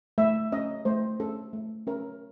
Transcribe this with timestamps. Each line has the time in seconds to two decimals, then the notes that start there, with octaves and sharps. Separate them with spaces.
0.18 A3 E5
0.52 C#4 D#5
0.85 A3 C5
1.20 C#4 A4
1.53 A3
1.87 C#4 A#4